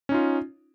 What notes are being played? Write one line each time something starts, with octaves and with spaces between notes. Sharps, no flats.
C#4 D#4 F4